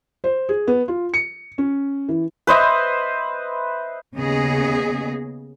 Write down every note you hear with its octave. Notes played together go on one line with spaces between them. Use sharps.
C5
G#4
B3
F4
C#7
C#4
E3
B4 C5 D#5 E5
D#2 C#3 B3 G#4 D#5